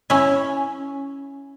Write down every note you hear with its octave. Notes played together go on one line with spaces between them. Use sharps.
C#4 E4